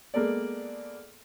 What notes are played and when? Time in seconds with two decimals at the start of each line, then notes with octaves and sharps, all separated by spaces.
0.14 G#3 A#3 B3 A4 D5